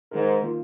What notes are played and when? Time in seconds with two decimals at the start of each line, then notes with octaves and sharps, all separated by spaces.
0.12 G#2 D#3 G#3 D#4 A#4
0.42 D#3 A#3 F4